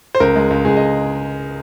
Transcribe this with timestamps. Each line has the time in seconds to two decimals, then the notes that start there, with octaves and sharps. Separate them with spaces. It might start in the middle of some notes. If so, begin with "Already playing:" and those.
0.15 C5
0.20 C#2 A#4
0.36 G#3
0.50 C#2
0.65 C#2 G#4
0.77 D#5